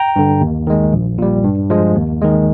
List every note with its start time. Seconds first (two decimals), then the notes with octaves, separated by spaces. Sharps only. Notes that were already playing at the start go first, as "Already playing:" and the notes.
Already playing: G5 A#5
0.16 G2 D3
0.41 D#2
0.67 D#3 G#3
0.93 A#1
1.18 A#2 G3
1.44 G2
1.70 F3 G#3
1.96 D#2
2.22 D#3 G#3